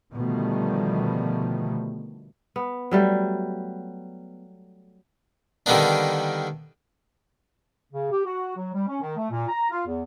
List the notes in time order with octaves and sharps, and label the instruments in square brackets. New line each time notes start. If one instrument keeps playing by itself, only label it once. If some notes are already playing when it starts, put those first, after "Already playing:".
[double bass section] B2 D3 D#3 F3 G3 A3
[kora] B3
F#3 G3 A3
[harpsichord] D3 D#3 G3 A#3 B3 D4
[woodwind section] C#3
G4
F#4
F#3
G3
C#4
D#3
A3
A#2
A#5
F4
E2